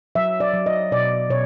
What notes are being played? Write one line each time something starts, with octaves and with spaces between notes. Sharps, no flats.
F#3 E5
D5
F#3
D#5
B2 D5
B2 C#5